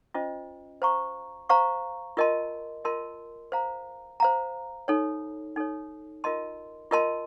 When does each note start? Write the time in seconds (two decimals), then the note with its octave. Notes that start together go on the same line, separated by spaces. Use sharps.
0.14 C#4 F4 C5 D#5
0.82 C5 F5 A#5 C#6
1.49 C5 F5 A#5 C#6
2.17 F4 A#4 D#5 A5 C6
2.85 F4 A#4 D#5 A5 C6
3.52 C5 F5 A#5
4.20 C5 F5 A#5
4.88 D#4 A4 C#5
5.56 D#4 A4 C#5
6.24 F4 A#4 D#5 A5 C6
6.91 F4 A#4 D#5 A5 C6